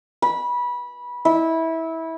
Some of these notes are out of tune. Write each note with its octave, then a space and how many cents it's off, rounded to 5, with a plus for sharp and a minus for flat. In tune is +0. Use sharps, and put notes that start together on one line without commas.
B5 -20
E4 -20